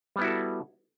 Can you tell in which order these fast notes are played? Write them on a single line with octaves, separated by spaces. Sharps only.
G3 B3 E4 F#4 A4